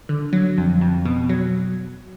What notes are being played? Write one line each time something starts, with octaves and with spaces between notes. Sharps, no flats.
D3
F#3
F2
F2
B2
F#3